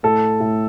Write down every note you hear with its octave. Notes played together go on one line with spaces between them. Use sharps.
A2 A4
A2